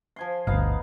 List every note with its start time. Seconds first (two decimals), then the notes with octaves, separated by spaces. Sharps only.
0.16 F3 G#5 C6
0.47 G1 D2 B3 D#4 F5